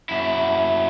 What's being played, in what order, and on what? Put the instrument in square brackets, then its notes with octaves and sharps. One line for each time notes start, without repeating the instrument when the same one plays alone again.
[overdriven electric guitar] F#2 E4